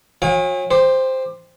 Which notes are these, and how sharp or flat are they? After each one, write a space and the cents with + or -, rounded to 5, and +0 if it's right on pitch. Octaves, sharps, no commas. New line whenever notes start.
F#3 -35 F5 +30 G#5 -35
G4 +20 C5 +0